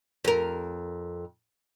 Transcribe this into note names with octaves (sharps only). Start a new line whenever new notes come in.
F2 A#4